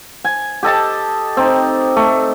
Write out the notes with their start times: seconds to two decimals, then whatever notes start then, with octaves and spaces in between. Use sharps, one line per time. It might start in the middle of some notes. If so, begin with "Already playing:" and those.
0.24 G#5
0.63 G4 A4 D#5 A5
1.37 C4 D#4
1.96 A3